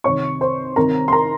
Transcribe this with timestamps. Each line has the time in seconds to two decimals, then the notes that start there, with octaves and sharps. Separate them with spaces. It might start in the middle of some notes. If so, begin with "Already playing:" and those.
0.04 C2 C3 D#3 C#5 C#6
0.41 C5 C6
0.76 C2 C3 D#3 A#4 A#5
1.08 C6
1.13 A#4 A#5